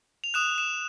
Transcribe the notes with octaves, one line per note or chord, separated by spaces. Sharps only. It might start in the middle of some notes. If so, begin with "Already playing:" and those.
F7
D#6 F#6 E7
E7